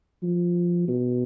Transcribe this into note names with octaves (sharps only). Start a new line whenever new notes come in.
F3
B2